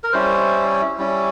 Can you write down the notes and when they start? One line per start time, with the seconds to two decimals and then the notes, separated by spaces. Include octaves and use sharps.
0.04 A#4
0.13 G3 C#4 E4 C5
0.98 G3 C#4 E4